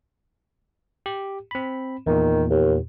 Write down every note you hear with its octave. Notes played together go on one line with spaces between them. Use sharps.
G4
C4 B5
E2 A#2 D#3
D#2